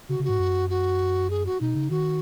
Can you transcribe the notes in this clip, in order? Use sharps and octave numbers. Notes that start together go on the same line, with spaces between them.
C#3 F#4
C#3
G#2 F#4
F#2
F#4
G#4
F#4
B2 D#4
C#3
D#3 F#4